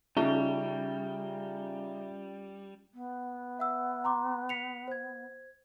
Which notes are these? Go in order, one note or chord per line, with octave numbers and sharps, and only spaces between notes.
C#3 G3 C#4 D#4 F4 E5 G7
B3
E5 F#5 E6
A#5 C6 D6
B6 C#7 F7
C5 G#6